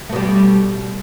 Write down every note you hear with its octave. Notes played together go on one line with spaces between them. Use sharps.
B2 G3 A3